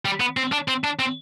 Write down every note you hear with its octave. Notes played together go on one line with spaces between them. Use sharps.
G3
B3
C4
D4
C4
D4
C4